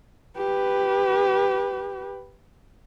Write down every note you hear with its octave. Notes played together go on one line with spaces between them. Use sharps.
G4 B4